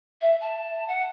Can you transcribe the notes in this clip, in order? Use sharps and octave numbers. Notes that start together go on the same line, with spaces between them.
E5
A5
F#5